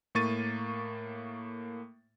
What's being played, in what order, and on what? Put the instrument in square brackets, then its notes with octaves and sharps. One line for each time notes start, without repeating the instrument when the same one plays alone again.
[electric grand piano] A2 A#3 C#6 A6 D#7